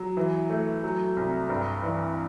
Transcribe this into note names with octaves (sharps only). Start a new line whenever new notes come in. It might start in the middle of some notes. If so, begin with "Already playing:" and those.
Already playing: F#3
E3
A3
F#3
C2
G2
E3